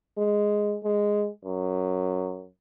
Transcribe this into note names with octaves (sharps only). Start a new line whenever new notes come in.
G#3
G#3
F#2